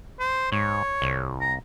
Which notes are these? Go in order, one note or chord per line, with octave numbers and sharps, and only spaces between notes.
C5
G#2 C#5
C2
A#5